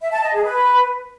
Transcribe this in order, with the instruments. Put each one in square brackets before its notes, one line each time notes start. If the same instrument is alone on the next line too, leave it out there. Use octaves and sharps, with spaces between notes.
[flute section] E5
A5
D#5
G#4
B4